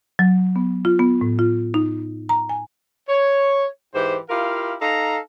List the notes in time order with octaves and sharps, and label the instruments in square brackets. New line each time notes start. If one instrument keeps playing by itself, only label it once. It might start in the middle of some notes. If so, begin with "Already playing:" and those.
[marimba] F#3
B3
F4
B3
A2
F4
D#4
A#5
G#5
[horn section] C#5
G#2 E3 G4 C5
E4 F4 G4 A#4 F5
D#4 A4 F5 A#5